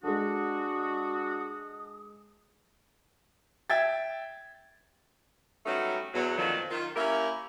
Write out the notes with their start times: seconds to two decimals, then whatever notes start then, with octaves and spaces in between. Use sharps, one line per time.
0.03 G#3 D4 F#4 A4 D#6
3.70 E5 G5 G#6 A6
5.65 F#3 G3 A3 B3 C#4 D#4
6.14 E2 F#3
6.36 F2 A#2 D3 D#3 F3 F#3
6.70 D#3 F4
6.96 A#3 C#4 E4 G4 A#4